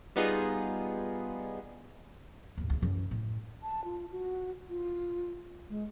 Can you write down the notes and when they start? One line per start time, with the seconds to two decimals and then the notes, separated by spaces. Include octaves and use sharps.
0.16 G3 B3 D#4 F4 G#4
2.58 D#2 A2
2.70 D2 G#3
2.82 F#2 E3
3.11 A2
3.63 A5
3.85 F4
4.11 F#4
4.69 F4
5.70 G#3